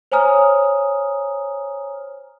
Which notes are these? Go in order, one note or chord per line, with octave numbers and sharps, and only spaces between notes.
C5 C#5 G#5 A#5 D#6 F6